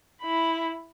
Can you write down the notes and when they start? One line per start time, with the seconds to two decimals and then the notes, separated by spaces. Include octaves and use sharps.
0.21 E4 B5